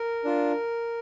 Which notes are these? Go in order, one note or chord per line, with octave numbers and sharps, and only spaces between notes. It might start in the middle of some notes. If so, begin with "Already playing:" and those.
Already playing: A#4
D4 F4